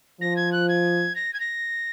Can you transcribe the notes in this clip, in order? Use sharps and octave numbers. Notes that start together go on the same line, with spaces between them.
F3 A#6
G#6
F#6
G#6
A#6
G#6
A#6